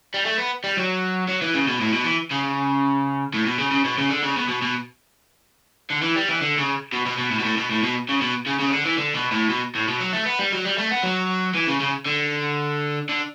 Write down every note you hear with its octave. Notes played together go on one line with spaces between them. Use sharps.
G3
A3
B3
G3
F#3
F#3
E3
C#3
B2
A2
B2
E3
C#3
A2
B2
C#3
C#3
B2
C#3
D3
C#3
B2
B2
B2
D3
E3
G3
E3
D3
C#3
B2
B2
B2
A2
B2
A2
B2
A2
B2
C#3
B2
C#3
C#3
D3
E3
D3
B2
A2
B2
A2
B2
F#3
A3
B3
G3
F#3
G3
A3
B3
F#3
E3
C#3
C#3
D3
D3